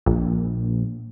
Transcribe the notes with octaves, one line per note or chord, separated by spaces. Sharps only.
A#1